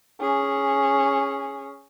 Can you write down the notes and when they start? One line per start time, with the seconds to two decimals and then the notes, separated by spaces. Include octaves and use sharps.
0.21 C#4 G#4